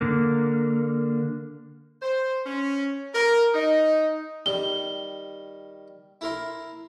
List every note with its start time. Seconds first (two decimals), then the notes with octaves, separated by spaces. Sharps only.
0.01 D3 A#3
2.02 C5
2.46 C#4
3.14 A#4
3.54 D#4
4.46 D#3 G3 G7
6.21 E4 A#4 C6